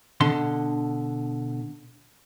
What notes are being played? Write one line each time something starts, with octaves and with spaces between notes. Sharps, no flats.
B2 D3 C6